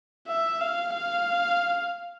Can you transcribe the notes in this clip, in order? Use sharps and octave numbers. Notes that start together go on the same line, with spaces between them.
E5
F5
F5